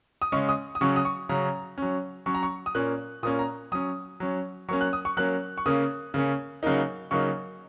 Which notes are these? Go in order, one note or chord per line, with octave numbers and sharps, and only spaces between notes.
D#6
C#3 G#3 C#4 C#6
D#6
D#6
C#3 F#3 C#4 C#6
D#6
C#6
C#3 F#3 C#4 A#5
F#3 C#4
F#3 C#4 C#6
A#5
C#6
D#6
A#2 A#3 C#4 F#6
A#2 A#3 C#4 D#6
A#5
F#3 C#4 D#6
F#3 C#4
F#3 A#3 C#4 C#6
F#6
D#6
C#6
F#3 A#3 C#4 F#6
C#6
C#3 A#3 C#4 D#6
C#3 A#3 C#4
C#3 F#3 A#3 D#4
C#3 F#3 A#3 D#4 C#6